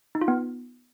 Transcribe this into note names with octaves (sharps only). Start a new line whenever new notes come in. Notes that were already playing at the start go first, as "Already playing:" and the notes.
D#4
F4
B3